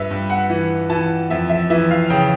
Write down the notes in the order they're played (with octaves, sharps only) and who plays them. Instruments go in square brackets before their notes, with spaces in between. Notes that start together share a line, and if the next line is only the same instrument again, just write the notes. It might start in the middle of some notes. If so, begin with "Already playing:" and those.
Already playing: [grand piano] G2 B4 E5
G2
F#5
E3
E3 A5
F2 E5
E5
E3 E5
F5
C#3 G5